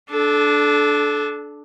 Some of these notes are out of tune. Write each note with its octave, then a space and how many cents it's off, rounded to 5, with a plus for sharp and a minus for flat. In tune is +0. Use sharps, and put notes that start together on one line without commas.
D4 +0 A4 -25